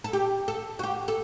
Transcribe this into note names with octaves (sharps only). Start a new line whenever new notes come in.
A4
G4
A4
F#4
G4
A4